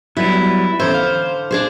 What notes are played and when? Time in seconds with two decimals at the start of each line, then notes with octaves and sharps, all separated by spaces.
0.17 F#3 G3 B3 E4
0.80 E2 D3 C#4 C5 E5
0.94 F5
1.51 D4 G#4 C5